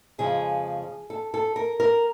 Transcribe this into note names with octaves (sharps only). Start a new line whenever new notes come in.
F2 C#3 F3 G#3 G#4
A4
A4
A#4
A#4